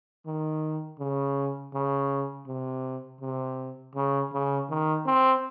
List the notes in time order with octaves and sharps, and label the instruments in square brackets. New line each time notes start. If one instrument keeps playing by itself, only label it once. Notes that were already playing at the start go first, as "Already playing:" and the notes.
[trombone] D#3
C#3
C#3
C3
C3
C#3
C#3
D#3
C4